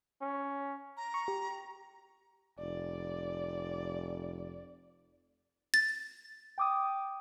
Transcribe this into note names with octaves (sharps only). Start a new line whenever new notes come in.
C#4
A#5
C#6
G4
F1 D5
A6
G5 D6 D#6